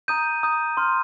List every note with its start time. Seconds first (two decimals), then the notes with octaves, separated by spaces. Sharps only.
0.08 A#5 D#6 G6 D#7
0.43 A#5 D#6 G6
0.77 C6 F6